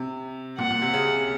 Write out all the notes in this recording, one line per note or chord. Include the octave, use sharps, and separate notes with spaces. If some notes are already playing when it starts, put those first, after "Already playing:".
Already playing: C3
A#2 F#5
A#2
C3
C#3